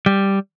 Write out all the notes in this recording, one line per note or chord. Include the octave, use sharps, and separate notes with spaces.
G3